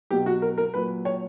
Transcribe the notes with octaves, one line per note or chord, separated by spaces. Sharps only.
B2 F#3 G4
F#4
A#4
A#4
A#2 F#3 B4
C#5